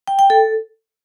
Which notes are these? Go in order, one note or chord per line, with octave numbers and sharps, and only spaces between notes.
G5
G5
A4